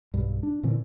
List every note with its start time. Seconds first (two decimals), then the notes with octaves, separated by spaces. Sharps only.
0.14 B1 G2
0.43 D4
0.63 A#2 D3 E3 C4